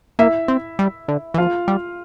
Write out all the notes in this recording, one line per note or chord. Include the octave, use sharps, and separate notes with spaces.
A#3 E4 E5
C4
G3
D3
E3
F3 F4 F5
G3